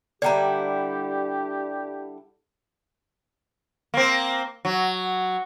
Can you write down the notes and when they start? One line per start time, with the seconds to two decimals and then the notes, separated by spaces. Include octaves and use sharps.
0.22 D3 G3 E4 G4 D5 G5 A#5
3.94 A#3 C4
4.65 F#3